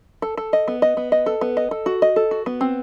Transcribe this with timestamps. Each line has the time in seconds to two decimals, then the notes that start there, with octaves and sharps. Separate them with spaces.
0.22 A4
0.37 A4
0.53 D#5
0.68 B3
0.82 D#5
0.97 B3
1.12 D#5
1.26 A4
1.41 B3
1.57 D#5
1.71 A4
1.86 F#4
2.02 D#5
2.16 A4
2.31 F#4
2.46 B3
2.61 C4